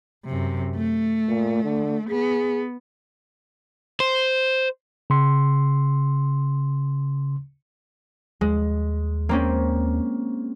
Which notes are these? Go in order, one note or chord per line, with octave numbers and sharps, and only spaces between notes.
F#2 C3
A3
A#2
D3
B3 G#4
C5
C#3 C6
D#2 G#3
A#3 C4 C#4